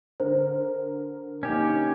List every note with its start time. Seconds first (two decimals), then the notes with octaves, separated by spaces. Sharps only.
0.20 D3 A#4 C5
1.43 A#3 C#4 D#4 G4